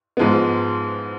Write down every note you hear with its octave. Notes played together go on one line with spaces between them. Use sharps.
G#2 F3 G#3 B3